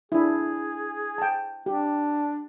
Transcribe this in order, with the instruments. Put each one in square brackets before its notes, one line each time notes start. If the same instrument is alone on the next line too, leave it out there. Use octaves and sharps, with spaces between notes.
[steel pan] D4 E4 [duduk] G#4
[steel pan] G5 A5
[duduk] D4 [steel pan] G4